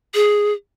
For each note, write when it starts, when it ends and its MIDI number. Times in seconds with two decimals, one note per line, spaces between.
0.15 0.52 68